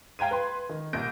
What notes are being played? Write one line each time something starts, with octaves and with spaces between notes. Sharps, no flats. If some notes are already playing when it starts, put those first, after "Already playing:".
F5 G5 A#5 G#6 D#7
B4 C6
D#3
C2 A#2 G6 A#6 D7